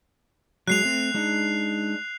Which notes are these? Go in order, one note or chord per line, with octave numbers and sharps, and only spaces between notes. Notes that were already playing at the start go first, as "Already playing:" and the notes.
F#3 G#3 F#6 C7 F7
A3 C4
G#3 D4 D#4